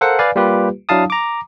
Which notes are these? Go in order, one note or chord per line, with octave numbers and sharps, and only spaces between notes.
A4 A#4 C5 F5 F#5
B4 D5 F5 G#5
G3 A#3 F4 G4 B4
F#3 D4 E4 F5 A5 D#6
A#5 D6